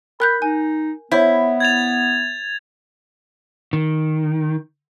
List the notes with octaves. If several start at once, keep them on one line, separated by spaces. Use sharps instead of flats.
A#4 B5 F#6 G6
D#4 G#5
B3 E4 C5 C#5
G#6 A6 F7
D#3